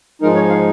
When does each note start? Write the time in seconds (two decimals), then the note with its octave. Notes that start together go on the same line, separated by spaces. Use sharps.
0.22 G#2 F3 G#3 D#4 A#4
0.35 C#5
0.49 F5